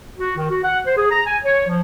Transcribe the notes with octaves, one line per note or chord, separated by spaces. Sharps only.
F#4
D#3
F#4
F#5
C5
G#4
A#5
G#5
C#5
F3